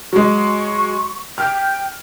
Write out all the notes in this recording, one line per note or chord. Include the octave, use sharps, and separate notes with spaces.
F#3 G#3 C#6
G5 F6